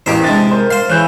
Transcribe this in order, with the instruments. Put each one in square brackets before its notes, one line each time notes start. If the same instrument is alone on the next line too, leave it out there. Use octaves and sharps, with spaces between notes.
[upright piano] A1 E2 [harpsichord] A#3 G4 C5
[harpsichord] C3 G#3 [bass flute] D4 [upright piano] A6
[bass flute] A#4 [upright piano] C5
[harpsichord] C5 C6 [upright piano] F5
[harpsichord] C#3 [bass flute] E3 [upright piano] F#6 G6